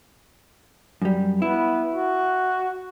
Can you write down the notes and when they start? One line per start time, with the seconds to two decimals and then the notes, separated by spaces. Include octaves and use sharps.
1.02 F#2 G3
1.42 B3 E4
1.95 F#4